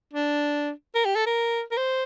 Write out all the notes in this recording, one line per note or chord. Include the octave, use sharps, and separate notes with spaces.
D4
A#4
G4
A4
A#4
A#4
C5